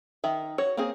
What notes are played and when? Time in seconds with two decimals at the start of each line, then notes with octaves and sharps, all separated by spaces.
0.24 D#3 E5
0.58 F#4 C#5
0.77 A#3 C4 G#4